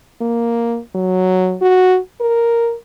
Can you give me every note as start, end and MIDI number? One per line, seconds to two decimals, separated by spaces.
0.21 0.79 58
0.96 1.57 54
1.62 1.98 66
2.21 2.75 70